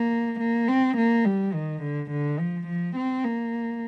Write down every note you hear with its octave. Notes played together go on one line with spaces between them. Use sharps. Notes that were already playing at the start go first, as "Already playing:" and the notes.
Already playing: A#3
A#3
C4
A#3
G3
D#3
D3
D3
F3
F3
C4
A#3